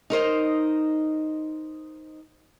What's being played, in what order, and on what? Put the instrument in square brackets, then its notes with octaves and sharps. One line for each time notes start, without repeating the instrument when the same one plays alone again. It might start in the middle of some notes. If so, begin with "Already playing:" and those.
[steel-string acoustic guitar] D#4 A#4 C5 D#5